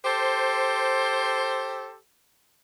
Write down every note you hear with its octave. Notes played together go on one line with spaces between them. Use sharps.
G4 A4 C5